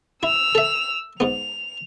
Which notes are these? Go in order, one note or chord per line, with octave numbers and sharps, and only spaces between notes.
E4 E6 F7
A4 E5
G#2 B3 F7